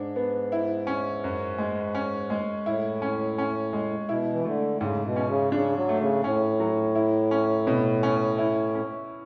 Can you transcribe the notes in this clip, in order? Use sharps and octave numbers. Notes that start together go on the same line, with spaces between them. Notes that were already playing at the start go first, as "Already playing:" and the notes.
Already playing: G#2 D4
B3
E4
C#4
F#2
G#3
C#4
G#3
A2 E4
C#4
C#4
G#3
B2 E4
E3
D3 A3
G#2 C#3
B2
C#4
C#3
C#3 D4
F#3
A3
C#3
A2 C#4
F#3
E4
C#4
B2
C#4
E4
C#4